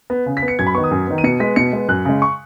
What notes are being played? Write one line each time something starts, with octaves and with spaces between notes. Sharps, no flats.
B3
C#3
B6
B3
C#7
F#2 G#6
B5
D#3 B3 C#6
D#6
F#2
D#3 B3
D#7
B2 C#7
G#3 B3 B6
B2 C#7
G#3 B3
F#2 F#6
C#3 G#3
C#6